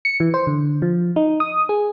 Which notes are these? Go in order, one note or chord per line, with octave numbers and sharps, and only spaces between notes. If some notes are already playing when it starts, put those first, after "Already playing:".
C#7
E3
C5
D3
F3
D#4
D#6
G#4